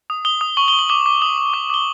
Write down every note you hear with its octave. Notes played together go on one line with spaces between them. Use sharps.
D#6
D#6 G7
D#6
C#6 F#7
G7
C#6
F#7
D6 G7
D6
D#6 F#7
D#6
D6
D6 G7